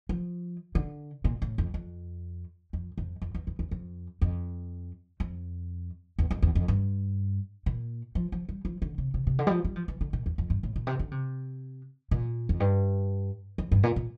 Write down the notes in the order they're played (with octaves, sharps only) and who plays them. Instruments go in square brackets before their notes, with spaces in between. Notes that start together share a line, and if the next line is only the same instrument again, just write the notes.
[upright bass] F3
D3
A#2
A2
F2
F2
F2
F2
F2
E2
E2
E2
F2
F2
F2
E2
F2
E2
F2
G2
A#2
F3
F3
G3
F3
D3
C3
C3
C3
D3
G3
F3
G3
F3
E3
D3
A#2
E2
F2
G2
A2
A#2
C3
D3
C3
A#2
F2
G2
F2
G2
A#2
A#2